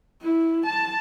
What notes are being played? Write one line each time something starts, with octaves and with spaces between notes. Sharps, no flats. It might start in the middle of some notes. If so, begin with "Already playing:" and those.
E4
A5